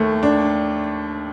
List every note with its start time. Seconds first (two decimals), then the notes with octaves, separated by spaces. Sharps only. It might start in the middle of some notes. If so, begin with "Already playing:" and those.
Already playing: D#2 A3
0.23 D4